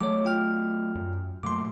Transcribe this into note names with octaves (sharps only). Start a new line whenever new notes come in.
F#3 A3 C#5 D6
F4 G5 F6
F#2
A#2 F#3 A3 C6 D6